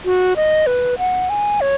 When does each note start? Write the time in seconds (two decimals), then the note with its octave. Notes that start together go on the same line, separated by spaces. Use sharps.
0.05 F#4
0.36 D#5
0.67 B4
0.99 F#5
1.30 G#5
1.61 C#5